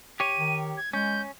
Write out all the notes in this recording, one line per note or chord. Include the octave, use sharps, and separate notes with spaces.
G4 C#5 D#7
D#3
G#6
G#3 C#4 G6